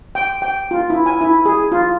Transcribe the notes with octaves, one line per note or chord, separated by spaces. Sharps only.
G5
G5
F4
E4
G#5
E4
G#4
F4